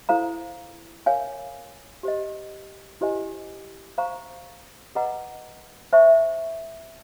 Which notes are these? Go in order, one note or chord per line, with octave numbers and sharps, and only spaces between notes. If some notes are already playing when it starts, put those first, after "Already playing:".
E4 A4 C5 F5 A#5
A#4 C#5 F5 G#5
G4 C5 D#5
E4 G4 C5 D#5 G#5
C5 F5 A#5 C#6
G#4 B4 D#5 F#5 A#5
C5 E5 A5 C#6